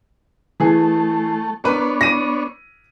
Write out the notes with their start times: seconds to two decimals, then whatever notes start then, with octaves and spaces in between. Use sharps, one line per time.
0.60 E3 A3 G#4
1.64 B3 D4 A#4 B4 C#5
2.01 A#6 D#7